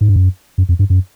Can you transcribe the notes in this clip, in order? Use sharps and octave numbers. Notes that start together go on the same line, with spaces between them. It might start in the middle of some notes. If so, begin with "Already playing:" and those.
G#2
G2
F#2
F#2
F2
G2
F#2